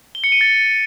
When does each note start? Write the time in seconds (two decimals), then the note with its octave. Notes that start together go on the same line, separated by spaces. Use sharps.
0.15 G7
0.24 C#7
0.32 D#7
0.41 A6